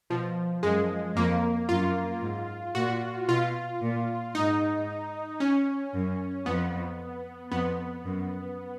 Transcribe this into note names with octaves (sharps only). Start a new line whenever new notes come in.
B2 F3
F#2 G#3
F2 A#3
F#2 F4
G#2
A#2 F#4
B2 F4
A#2
G#2 D#4
C#4
F#2
F2 B3
F2 B3
F#2